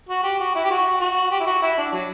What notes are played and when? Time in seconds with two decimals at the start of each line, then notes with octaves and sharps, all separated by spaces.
0.09 F#4
0.23 G4
0.40 F#4
0.55 E4
0.64 G4
0.71 F#4
1.00 F#4
1.31 G4
1.40 E4
1.47 F#4
1.62 E4
1.78 D4
1.93 F#3